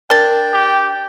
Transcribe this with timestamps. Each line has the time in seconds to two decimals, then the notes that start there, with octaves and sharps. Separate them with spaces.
0.10 D4 A#4 G5 A6
0.54 G4